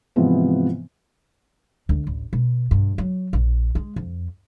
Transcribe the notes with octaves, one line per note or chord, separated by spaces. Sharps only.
G#2 C3 E3 F3 B3
D2
A1
B2
G2
F#3
A#1
G#3
F2